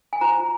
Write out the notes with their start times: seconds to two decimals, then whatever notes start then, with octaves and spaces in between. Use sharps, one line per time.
0.13 G#5
0.21 F4 C5 A#5